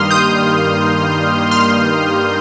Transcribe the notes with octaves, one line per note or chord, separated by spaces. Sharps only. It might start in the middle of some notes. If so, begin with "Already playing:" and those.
Already playing: G2 D#3 G3 A#3 C6 D#6 F6
D#6 G6
C6 F6